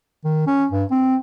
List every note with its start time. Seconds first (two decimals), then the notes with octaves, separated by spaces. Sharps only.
0.25 D#3
0.47 C#4
0.72 G2
0.91 C4